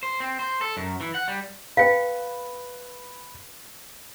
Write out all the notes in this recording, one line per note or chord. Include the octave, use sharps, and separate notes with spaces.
C5
C4
C5
A4
F#2
E3
F#5
G3
B4 F5 G5